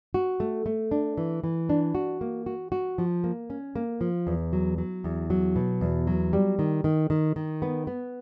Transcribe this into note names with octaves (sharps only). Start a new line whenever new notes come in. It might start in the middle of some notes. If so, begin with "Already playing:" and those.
F#4
A3
A3
D4
E3
E3
D4
F#4
A#3
F#4
F#4
F3
A#3
C#4
A#3
F3
E2
F#3
F#3
E2
F#3
B2
E2
F#3
G3
D#3
D#3
D#3
D#3
B3
B3